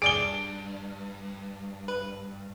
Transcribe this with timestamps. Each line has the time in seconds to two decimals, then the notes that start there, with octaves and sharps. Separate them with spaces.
0.02 G2 G#4 D5 D7 G7
1.88 B4